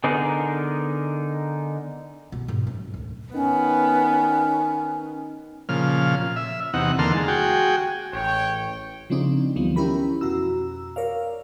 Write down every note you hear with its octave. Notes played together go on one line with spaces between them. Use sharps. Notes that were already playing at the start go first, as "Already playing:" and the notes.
D3 B3 D#4 G#4 A#4
B2
G#2
F#2
D2
D#3 B3 C#4
A#2 C#3 F3 F6
E5
E2 C3 D#4 F#5
E2 D3 A#3 A5 C6 F6
G#3
F#4 G#4 G5
A1 C#5 G5
C#3 F3 G#3 C4 D4 D#4
D2 D3 E3 F3 G3 B3
C#4 E4 G4 A#4 B5
F2 B2 F#4 A#5 E6
A#4 C#5 D5 F5